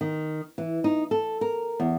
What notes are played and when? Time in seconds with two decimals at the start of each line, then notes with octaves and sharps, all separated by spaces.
0.01 D#3
0.58 E3
0.84 D#4
1.11 A4
1.41 A#4
1.80 E2